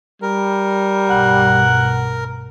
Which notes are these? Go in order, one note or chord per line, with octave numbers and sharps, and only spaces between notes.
G3 A#4
B1 G2 F#5